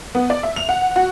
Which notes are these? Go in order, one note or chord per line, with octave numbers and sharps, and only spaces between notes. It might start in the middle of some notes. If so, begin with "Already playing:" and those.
B3
D5
E5
F7
F#5
F#4